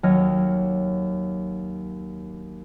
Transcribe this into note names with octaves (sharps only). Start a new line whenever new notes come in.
D#2 F#3 C#5 D#5 F6